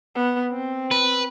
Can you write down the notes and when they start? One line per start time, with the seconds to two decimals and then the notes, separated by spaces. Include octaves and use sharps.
0.15 B3
0.52 C4
0.91 B4